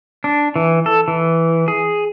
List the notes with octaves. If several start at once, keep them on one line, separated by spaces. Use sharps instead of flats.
D4
E3
A4
E3
G#4